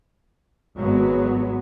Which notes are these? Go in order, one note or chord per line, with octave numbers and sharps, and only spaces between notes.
G#1 F#3 G#3 B3